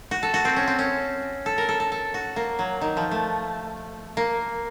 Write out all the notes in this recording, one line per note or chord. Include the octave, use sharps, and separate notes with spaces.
F#4
A4
F#4
C4
C#4
C4
C#4
A4
A#4
A4
A4
A4
F#4
A#3
F#3
D#3
F3
A3
A#3